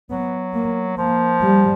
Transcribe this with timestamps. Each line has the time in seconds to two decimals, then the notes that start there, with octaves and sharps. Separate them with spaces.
0.10 F#3 B3
0.54 A#3
0.97 F3 A#3
1.41 G3